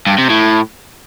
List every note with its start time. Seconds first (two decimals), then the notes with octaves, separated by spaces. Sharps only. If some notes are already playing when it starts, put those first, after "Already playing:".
0.07 G2
0.18 C3
0.30 A2